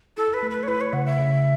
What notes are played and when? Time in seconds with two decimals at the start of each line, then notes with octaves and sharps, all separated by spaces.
0.17 E4 A4
0.34 B4
0.43 A3
0.51 B4
0.63 C#5
0.68 E4 B4
0.81 C#5
0.93 C#3 F#5
1.06 E5
1.19 C#3